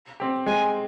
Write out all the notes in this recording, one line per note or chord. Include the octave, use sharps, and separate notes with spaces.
C4 G4
G#3 G#5